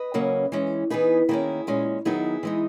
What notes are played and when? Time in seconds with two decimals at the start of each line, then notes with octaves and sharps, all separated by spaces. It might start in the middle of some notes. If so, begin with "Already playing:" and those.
Already playing: B4 D#5
0.14 C#3 F#3 A#3 C#4
0.52 E3 G#3 C#4
0.90 E3 B3 D#4 G#4 B4
1.29 D#3 A#3 C#4 E4 G#4
1.67 A#2 G#3 C#4
2.05 D#3 F#3 B3 D#4 E4 G#4
2.43 E3 G#3 D#4